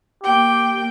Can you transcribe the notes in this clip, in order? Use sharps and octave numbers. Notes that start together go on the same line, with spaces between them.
A#3 G4 G5